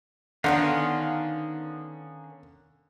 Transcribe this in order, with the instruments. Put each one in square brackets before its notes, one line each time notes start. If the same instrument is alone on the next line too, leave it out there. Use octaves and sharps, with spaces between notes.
[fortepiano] D3 [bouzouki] D#3 B3 C#4 [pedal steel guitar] F5 A#5 C6